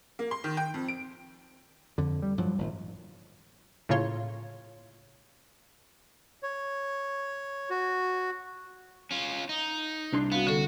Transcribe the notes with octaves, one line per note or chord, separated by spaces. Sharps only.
A#3
C6
D#3
G5
F2
D7
F2 D3
G3
G2 F3 F#3
G#1 A#2
A2 C#3 A#3 F4 C#5 C6
C#5
F#4
C#4 F4
D#4
C2 D4 C6
B3 F#4 F5
D3 F#4 A4